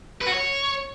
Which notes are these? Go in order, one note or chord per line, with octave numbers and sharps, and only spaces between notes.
B4
F#4
C#5